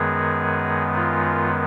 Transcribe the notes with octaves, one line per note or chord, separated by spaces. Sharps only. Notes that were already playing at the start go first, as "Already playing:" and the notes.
Already playing: F#2 D#3 G#3 B3 G#4
F4